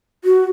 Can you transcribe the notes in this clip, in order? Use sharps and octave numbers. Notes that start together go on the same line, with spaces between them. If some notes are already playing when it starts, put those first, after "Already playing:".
F#4